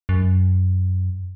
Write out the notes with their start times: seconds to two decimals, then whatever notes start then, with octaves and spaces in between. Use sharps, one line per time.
0.09 F#2